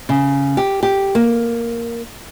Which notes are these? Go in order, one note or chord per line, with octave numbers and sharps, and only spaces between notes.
C#3
G4
G4
A#3